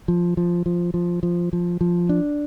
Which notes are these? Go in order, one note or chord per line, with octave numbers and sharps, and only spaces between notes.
F3
F3
F3
F3
F3
F3
F3
D4